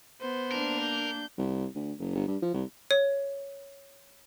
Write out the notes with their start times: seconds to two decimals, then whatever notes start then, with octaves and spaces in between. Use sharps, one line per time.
0.21 B3 C5
0.51 A#3 D4 A#4
0.81 G6
1.38 C2
1.75 D2
1.99 F#1
2.15 G1
2.28 G2
2.42 F3
2.54 C2
2.91 C#5